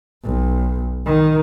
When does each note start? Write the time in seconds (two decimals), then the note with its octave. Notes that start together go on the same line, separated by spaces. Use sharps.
0.24 B1
1.06 D#3